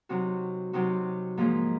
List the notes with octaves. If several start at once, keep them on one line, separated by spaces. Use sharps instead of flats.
C3 F#3 C4 D#4 F#4
C3 F#3 C4 D#4 F#4
G#2 F3 A#3 D#4 G#4